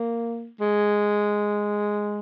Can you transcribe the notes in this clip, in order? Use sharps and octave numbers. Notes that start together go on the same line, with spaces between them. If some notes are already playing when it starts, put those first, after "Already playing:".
Already playing: A#3
G#3